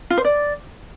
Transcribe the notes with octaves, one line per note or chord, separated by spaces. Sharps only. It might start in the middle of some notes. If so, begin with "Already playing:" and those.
F4
C5
D5